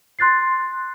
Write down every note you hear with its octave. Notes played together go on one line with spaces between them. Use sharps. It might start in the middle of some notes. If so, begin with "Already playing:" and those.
C6 F#6 A6 C7